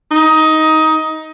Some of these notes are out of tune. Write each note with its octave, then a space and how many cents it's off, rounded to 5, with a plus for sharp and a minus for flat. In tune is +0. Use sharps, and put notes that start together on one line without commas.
D#4 +15